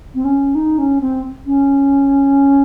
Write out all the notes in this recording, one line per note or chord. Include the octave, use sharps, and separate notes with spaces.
C4
C#4
D#4
C#4
C4
C#4